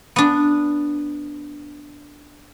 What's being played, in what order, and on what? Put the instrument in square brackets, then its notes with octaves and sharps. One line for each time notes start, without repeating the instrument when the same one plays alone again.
[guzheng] B3 D4